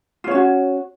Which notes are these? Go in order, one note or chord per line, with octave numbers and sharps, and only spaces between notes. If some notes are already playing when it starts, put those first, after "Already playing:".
C#4 F4 F#4 C#5